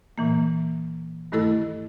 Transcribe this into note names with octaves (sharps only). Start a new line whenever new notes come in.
A#2 E3 A#3
G2 D#3 A3 E4 A4 E6